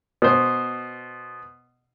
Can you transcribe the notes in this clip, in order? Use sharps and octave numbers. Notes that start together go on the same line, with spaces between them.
B2 C5